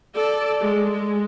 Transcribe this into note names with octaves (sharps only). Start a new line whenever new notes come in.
A4 D5
G#3
G#3